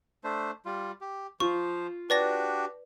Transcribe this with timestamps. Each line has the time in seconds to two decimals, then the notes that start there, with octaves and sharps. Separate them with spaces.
0.24 A3 D4 C5
0.65 G3 F4
1.01 G4
1.40 F3 F4 C5 C#6
2.10 D4 F#4 G4 B4 D5 A#6